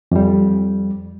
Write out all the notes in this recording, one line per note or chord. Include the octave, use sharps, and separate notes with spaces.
F2 G3